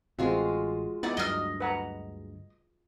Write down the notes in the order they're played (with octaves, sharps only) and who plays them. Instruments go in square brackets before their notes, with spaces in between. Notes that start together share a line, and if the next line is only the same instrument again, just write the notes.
[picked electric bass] A1 [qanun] G#3 F4 F#4 [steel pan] C4
[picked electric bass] B3 [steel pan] D#4 E4 [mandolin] D5 F#5
[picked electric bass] D2 G2 F#3 [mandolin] D#5 F6
[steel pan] B4 F#5 A#5